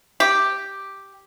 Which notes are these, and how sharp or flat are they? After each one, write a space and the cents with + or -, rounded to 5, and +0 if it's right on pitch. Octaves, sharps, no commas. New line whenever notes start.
G4 +0